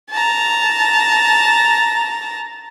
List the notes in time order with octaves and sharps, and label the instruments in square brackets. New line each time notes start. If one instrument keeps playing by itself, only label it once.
[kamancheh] A5 A#5